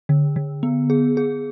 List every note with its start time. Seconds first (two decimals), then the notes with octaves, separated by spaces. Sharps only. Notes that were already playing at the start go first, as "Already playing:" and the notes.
0.09 D3
0.36 D3
0.63 B3
0.90 G#4
1.17 G#4